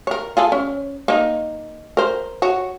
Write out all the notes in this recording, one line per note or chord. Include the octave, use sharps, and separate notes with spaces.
A#4 C#5
F4 G#4 A4
C#4
A#3 D#4
A#4 C5
F#4 C#5